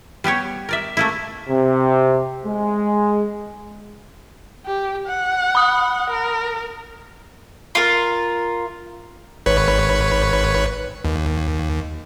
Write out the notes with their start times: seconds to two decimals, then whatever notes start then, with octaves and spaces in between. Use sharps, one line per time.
0.24 G3 B3 G4 C#5
0.69 A#4 D5 E5
0.97 A3 A#3 E4
1.49 C3
2.46 G#3
4.66 G4
5.07 F#5
5.55 B5 D#6
6.10 A#4
7.75 F4 A#4
9.46 G#1 B4 C#5
11.05 D#2